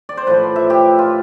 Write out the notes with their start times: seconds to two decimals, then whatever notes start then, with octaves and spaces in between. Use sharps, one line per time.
0.09 D5
0.17 C5
0.27 A2 F3 B4
0.56 E5
0.70 G4
0.99 F4